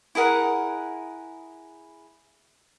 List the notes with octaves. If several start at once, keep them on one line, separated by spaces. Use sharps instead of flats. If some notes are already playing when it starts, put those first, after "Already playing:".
E4 G#4 A#4 F#5